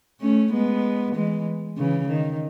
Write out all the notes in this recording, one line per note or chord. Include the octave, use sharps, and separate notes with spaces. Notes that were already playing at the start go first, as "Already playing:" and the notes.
A3 C#4
G#3 B3
E3 G#3
C#3 E3
D#3